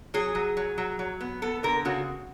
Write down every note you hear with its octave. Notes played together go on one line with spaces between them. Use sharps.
F#3 G#4
F#3
F#3
F#3
F#3
B3
B3 A4
D3 A#4
C#3 F#4